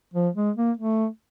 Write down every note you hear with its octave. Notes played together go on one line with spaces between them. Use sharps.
F3
G#3
A#3
A3